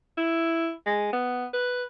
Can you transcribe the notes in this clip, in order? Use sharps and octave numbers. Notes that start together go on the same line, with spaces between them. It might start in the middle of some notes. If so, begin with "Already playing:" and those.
E4
G#3
B3
B4